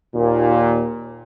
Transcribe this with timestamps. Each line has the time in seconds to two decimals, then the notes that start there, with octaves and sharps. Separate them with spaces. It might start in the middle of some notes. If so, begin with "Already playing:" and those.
0.15 D#2 A#2